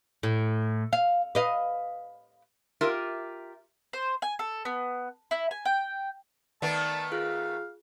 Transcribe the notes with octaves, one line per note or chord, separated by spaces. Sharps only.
A2
F5
B4 D#5 F5
F4 G4 A#4 E5
C5
G#5
A4
B3
E4
G#5
G5
D#3 A3 B3 D5 A5 A6
F4 G#4 F5 F#6